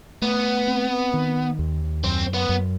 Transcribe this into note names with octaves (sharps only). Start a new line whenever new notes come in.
A3 B3
C4
D#3
D#2
F#2 C4
B3
F#2